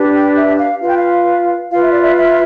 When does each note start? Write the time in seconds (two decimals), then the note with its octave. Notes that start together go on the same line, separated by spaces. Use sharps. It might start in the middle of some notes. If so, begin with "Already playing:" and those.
Already playing: D4 G4 B4
0.14 G5
0.36 E5
0.59 F5
0.81 F4 B4 F5
0.89 G5
0.98 F5
1.71 F4 B4 F5
1.82 E5
1.92 D5
2.02 E5
2.17 E5